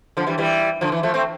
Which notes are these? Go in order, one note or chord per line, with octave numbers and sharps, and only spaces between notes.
D3 F3
E3 G3
E3 G3
D3 F3
E3
F3 A3
A3 C4